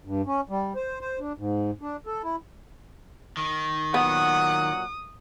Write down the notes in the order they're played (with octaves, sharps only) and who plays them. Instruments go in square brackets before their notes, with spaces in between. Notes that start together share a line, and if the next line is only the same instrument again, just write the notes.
[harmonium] G2
C#4
G3
C5
C5
D4
G#2
D4
A4
E4
[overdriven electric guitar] D#3
[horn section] A#2 F#3 F#5 [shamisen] B3 [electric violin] D#6